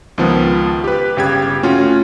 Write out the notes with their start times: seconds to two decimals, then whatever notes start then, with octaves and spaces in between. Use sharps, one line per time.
0.18 C#2 D#3 F3 B3
0.84 G4 B4
1.17 G1 C#3 G4 G5 G#6
1.63 A3 C#4 F4 F#4